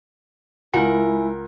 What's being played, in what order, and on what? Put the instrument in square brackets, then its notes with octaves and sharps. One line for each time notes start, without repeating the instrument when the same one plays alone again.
[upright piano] C#2 [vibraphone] G#3 [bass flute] E4 [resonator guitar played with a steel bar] A#4 F#5